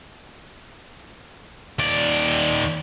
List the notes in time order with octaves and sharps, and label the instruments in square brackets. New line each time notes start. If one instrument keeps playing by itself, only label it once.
[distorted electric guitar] D#2 D5